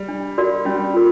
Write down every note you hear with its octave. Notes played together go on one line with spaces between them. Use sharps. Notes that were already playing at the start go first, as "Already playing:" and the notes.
Already playing: G3
D4
F#4 A#4 D5 F5
G3 C#4
F4 A#4